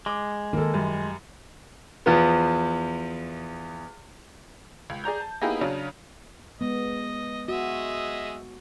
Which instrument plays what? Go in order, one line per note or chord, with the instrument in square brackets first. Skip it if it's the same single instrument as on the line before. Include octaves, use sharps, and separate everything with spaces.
[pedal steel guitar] G#3 [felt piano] D6
[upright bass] D#3 F4 [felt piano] A#3 A4
[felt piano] F#2 G3
[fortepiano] E2 F3 B3
[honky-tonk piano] C#2
G#4 D5 A#5 G6
A5
A#3 B3 D#4 E4 G4 G#4
C#3 F#3 C#4 D4
[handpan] G#3 B3 [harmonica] D#5
[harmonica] G#3 D#5 E5 [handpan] F#4